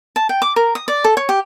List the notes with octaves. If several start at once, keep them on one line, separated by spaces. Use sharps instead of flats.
A5
G5
D6
A#4
D#6
D5
A4
C#5
G4